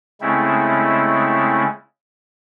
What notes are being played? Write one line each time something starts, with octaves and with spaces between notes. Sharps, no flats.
C#3 G#3 A3 C4 C#4 E4